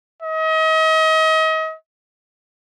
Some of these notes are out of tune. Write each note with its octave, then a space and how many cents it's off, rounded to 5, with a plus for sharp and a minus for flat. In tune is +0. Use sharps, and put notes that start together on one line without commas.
D#5 +35